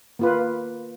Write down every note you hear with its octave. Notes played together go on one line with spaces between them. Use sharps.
A#3 F4 B4